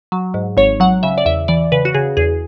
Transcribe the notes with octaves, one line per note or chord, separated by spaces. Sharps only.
F#3
G#2
G#1 C#5
F#3 F#5
C#3 E5
D5
E2 E5
E3 D5
C#3 B4
F#4
C#3 G#4
E2 G#4